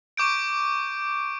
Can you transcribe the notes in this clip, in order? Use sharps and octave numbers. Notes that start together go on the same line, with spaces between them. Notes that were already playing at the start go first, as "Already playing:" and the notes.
C#6 D6 G6 D7